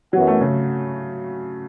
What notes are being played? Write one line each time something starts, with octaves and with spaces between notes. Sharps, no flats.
F#2 E3 F#3 B3 F#4
A3
C#3